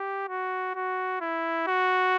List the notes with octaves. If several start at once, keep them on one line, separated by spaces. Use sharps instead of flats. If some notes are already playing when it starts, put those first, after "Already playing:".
Already playing: G4
F#4
F#4
E4
F#4